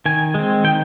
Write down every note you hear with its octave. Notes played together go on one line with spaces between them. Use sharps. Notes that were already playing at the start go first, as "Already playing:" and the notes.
D#3 G#5
G#3 C4
D#3 G5